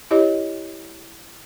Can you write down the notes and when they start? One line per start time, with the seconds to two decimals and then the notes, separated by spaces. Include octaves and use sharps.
0.11 E4 G4 C#5 D#5